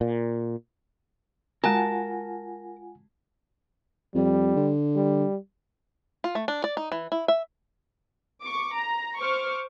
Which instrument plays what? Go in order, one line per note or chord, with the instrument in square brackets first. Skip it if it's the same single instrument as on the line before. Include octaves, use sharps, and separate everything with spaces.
[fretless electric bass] A#2
[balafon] G#3 F#4 [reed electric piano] F4 F#5 G#5 [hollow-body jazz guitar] A#4 [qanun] A5
[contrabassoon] F2 [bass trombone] G3
[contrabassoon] D3
[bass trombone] G3
[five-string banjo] F4
A3
D4
D5
D#4
E3
E4
E5
[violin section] C#6 D6
A#5
C5 C#6 D6 F6